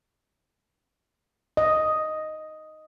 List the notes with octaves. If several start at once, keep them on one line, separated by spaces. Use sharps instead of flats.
D#5